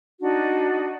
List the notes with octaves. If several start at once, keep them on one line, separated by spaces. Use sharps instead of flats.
D4 D#4 F#4